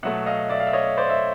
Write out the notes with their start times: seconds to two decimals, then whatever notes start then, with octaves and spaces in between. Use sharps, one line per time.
0.03 B2 F#3 A3 E5 F#5
0.26 D#5 F5
0.49 D5 E5
0.60 F5
0.67 E5
0.73 C#5 D#5
0.97 C5 D5
1.10 E5